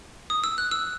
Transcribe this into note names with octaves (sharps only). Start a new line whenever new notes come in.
D#6
E6
F#6
E6